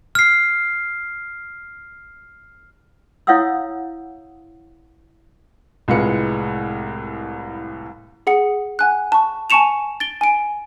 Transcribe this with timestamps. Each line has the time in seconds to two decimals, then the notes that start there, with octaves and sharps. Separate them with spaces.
0.15 F6 C7
3.27 E4 C#5 F5 F#5 D#6 E6
5.88 C2 A2 G#3 F4 B4 C#7
8.27 G#4 F#5 C#7
8.79 F#5 G#5 F#6
9.12 A5 C#6
9.50 G#5 A5 C#6 C#7 E7 F7
10.00 A6 D7 G7
10.21 G#5 D7